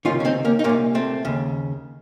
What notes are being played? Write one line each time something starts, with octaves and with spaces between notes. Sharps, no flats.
C#2 C3 D#3 C#4 F4
C#4
C4 D#4
A#3 C#4
D#4
A#2 A#3 C#4
C2
A3 C4
D#2 C#3